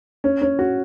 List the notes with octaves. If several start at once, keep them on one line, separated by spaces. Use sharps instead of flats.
C#4
C#4
F#4